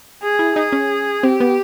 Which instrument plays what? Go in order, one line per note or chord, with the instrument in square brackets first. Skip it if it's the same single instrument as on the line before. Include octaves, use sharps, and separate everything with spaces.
[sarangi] G#4
[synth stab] E4
[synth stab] D#4 [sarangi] G#4
[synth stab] C#4
[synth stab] C4 [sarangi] G4
[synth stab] B3